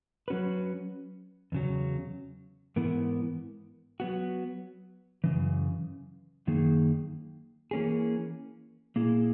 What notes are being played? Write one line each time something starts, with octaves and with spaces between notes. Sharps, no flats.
F#3 C#4 F#4 B4
E2 C#3 F#3
G#2 E3 B3 E4 A#4
F#3 B3 F#4
F#2 C#3 E3
F#2 D#3 A#3 D#4 G#4
E3 A#3 C#4 G#4
A#2 A#3 E4 G#4